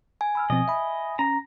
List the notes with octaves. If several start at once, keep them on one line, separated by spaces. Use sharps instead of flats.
G#5
B5 E6 F6
B2 F3 C4 D#5
E5 B5
C#4 A#5